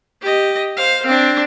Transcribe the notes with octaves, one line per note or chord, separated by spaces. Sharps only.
G4 D#5
C5 F5
C4 D4